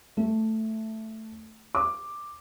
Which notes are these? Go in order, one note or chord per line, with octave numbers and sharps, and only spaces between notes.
A3
D6